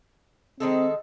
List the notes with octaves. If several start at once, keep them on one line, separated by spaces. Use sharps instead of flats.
D#3 G#3 C4 A4